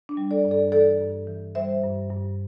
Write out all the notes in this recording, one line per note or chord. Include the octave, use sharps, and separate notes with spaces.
D4
G3
A4 D5
G2
A4 D5
E3 A4 D5
G2
E3
G3 C5 E5
G2
G2